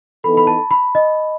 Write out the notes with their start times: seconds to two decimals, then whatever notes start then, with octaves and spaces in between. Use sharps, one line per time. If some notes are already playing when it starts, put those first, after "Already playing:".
0.24 E3 B3 D#4 A4 B5
0.37 B5
0.47 A5
0.71 B5
0.95 D#5